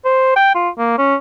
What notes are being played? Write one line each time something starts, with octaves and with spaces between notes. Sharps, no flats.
C5
G5
F4
A#3
C#4